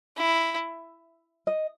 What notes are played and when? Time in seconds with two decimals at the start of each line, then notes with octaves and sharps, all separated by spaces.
0.17 E4
1.47 D#5